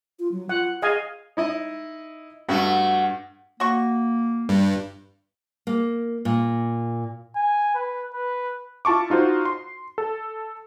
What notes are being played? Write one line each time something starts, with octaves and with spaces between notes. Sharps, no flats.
F4
F#3
F4 F#5
G#4 D#5 F5 G#5
D#4 E4 D#5
G2 A3 F#4
A#3 F#4 C#6
G2
A#3
A#2
G#5
B4
B4
E4 F4 A5 C#6 D6
D#4 F4 F#4 C5
C6
A4